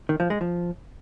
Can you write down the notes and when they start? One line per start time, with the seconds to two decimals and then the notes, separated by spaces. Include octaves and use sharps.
0.09 D#3
0.20 F3
0.30 G#3
0.41 F3